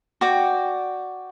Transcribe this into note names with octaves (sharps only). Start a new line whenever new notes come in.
F#4 D5 G5